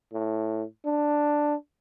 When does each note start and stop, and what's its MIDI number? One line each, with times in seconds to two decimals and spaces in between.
0.13 0.63 45
0.86 1.54 62